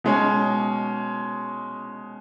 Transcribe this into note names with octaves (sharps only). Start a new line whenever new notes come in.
B2 G#3 C#4